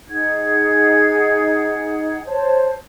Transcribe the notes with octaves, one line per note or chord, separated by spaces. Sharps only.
D#4 G#4 F#5 G#6
C5 C#5 A5